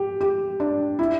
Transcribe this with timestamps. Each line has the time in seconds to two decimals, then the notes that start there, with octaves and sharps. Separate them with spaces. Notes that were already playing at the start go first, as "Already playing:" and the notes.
Already playing: G4
0.21 G4
0.60 D4
0.99 E4